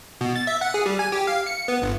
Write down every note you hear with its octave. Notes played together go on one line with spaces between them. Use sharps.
B2
A6
E5
F#5
G#4
G3
G#5
G4
F5
C#7
B3
G1